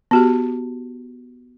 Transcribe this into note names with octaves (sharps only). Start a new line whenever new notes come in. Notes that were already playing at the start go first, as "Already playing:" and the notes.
B3 F#4 G4